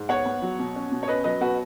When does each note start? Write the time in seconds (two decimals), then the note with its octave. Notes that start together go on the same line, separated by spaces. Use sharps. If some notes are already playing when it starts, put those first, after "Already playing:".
Already playing: G#2
0.09 B3 C#5 F#5
0.26 B3
0.42 F#3
0.59 B2
0.76 C#4
0.92 B2
1.03 C#5
1.08 C#4 B4 D#5
1.24 F#3 B4 D#5
1.41 B2 F#4 B4